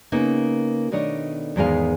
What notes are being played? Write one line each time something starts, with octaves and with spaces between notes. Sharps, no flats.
C#3 A#3 B3 D#4
B2 D#3 A3 D4 C#5 D#5
E2 G#2 D#3 G#3 B3 F5